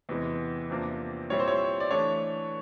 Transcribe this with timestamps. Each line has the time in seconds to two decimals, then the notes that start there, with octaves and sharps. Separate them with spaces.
0.09 E2 C3 E3 G#3
0.70 E2 C3 F3 A#3 D4
1.30 A#2 G3 C4 E4 C#5
1.40 C5
1.48 C#5
1.80 D5
1.91 E3 A3 D4 C#5